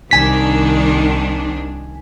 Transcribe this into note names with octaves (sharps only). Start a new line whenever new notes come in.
C2 D#3 D4 G#5 B6